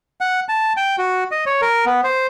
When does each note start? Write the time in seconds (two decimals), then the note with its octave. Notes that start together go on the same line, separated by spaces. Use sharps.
0.21 F#5
0.49 A5
0.77 G5
0.98 F#4
1.31 D#5
1.46 C#5
1.62 A#4
1.86 B3
2.04 C5